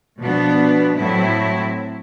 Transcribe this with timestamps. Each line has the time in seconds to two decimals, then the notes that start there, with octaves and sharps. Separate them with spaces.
0.21 B2 F3 B3 D4
0.98 A2 F#3 C4 E4